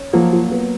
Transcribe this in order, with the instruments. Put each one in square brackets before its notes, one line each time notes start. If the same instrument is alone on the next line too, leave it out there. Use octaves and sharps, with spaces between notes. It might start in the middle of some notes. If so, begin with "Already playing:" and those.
Already playing: [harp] C#4
[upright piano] F3 [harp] F#3 A#3
[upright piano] F4
B3